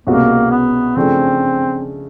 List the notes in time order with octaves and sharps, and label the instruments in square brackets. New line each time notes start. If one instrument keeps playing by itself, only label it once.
[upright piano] C2 B2 G#3 C#4 F#4 [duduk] A#3
[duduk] B3
[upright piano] C#3 F3 A3 D4 [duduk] C4